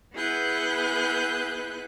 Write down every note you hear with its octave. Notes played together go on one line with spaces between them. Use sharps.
B3 E4 G#4 B4 F#6 G6